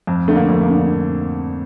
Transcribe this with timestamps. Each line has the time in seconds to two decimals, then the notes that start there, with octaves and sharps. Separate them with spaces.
0.07 F2
0.28 D3 A3
0.35 A#3
0.49 F2
0.63 A#3
0.70 D3